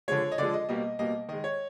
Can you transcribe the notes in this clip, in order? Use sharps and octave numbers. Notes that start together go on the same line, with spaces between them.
D3 F3 G#3 C#5
D#5
D3 F3 G#3 D5
D#5
B2 G3 A#3 D#5
B2 G3 A#3 D#5
D#3 G#3 D#5
C#5